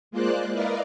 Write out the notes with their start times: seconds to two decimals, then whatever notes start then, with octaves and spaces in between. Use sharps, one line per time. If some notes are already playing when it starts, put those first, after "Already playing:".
0.11 G#3 A#3 F4 C5 D5 F#6
0.51 E4 A#4 B4 D5 D#5 F5